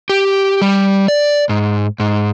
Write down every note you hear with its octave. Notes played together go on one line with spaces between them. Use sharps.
G4
G3
D5
G#2
G#2